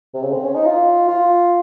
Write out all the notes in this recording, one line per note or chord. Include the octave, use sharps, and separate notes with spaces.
C3
C#3
C4
C#4
D#4
F4
F4